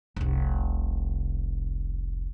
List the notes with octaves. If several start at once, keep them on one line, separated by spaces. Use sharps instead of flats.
F1 C2